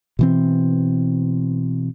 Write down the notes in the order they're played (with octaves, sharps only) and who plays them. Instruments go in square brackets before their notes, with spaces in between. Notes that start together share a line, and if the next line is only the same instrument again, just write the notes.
[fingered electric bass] B2 E3 C4